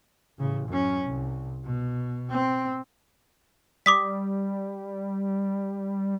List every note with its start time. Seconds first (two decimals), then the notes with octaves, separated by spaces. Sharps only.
0.38 A1 C#3
0.68 F#2 C#4
1.04 C2
1.64 B2
2.31 C4
3.86 G3 D6 D#6 B6